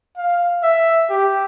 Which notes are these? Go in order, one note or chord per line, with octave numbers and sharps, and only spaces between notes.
F5
E5
G4